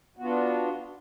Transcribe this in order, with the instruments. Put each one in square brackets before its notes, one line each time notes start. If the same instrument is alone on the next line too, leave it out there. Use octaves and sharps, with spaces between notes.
[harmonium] F#4
B3
F4
D4